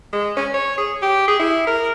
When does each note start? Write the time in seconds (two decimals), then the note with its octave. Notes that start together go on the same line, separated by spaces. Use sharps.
0.13 G#3
0.36 C#4
0.54 C#5
0.78 G#4
1.02 G4
1.28 G#4
1.39 E4
1.67 A#4